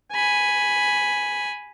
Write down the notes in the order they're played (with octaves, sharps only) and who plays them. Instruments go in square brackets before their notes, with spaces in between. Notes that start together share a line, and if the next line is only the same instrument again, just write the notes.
[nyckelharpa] G#5 B5